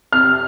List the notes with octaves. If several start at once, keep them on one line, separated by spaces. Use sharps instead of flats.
C3 F6